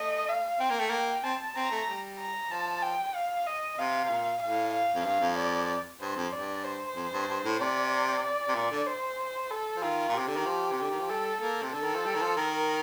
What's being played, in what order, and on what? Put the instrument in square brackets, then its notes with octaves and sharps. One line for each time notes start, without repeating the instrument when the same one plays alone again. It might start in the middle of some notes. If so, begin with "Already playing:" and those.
Already playing: [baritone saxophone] A3 [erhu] D#5
[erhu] F5
[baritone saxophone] C4 [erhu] G5
[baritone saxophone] A#3
A3
[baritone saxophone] A#3 [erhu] G5
[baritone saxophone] C4 [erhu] A5
[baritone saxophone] C4 [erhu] A#5
[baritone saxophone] A3
G3
[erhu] A#5
[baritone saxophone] F3 [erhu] A5
[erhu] G5
F5
D#5
[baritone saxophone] C3 [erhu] F5
[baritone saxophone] C3
A#2
[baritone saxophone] A2 [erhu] F5
[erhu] F5
[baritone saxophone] F2
[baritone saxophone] G2 [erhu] F5
[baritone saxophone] F2
[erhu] D5
[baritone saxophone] G2 [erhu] C5
[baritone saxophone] F2
[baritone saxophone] G2 [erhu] D5
[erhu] C5
[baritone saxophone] F2
G2
G2
A2
[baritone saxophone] C3 [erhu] D5
[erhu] D5
[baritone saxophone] C3
A#2
D3
[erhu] C5
A4
[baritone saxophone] F3
[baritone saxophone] D#3 [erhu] F4
[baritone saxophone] A#2
[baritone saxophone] C3 [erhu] G4
[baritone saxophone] D3
D#3
F3
C3
D3
D#3
F3
[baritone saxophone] G3 [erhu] A4
[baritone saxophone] A#3 [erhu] A4
[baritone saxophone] C3
[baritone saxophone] D3 [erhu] A4
[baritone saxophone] D#3
F3
G3
D#3
F3
[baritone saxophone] D#3 [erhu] A#4